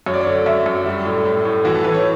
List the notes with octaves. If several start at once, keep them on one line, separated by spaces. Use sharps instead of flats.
F#2 C#5
D5
C#5
D3
F#2 E5
F#2
G3
A2
A2
A2
E3 F#4
A4
E3 B4
C#5